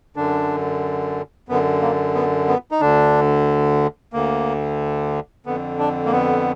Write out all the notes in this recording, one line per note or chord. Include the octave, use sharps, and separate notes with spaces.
F#2 D3 D4
F#2 D3 B3
A#3
B3
B3
D#4
D2 D3 D4
D2 D3 A#3
F2 D3 B3
D4
A#3
B3